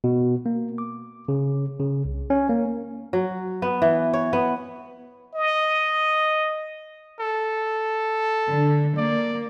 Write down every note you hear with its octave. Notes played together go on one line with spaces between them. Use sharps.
B2
A#3
D6
C#3
C#3
C2
C#4
A#3
F#3
B3
E3
C#5
B3
D#5
A4
D3
A#3 D5